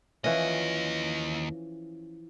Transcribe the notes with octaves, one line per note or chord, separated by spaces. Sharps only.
D#2 E3 F3 C#4 D#5